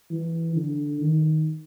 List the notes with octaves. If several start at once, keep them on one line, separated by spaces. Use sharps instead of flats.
E3
D3
D#3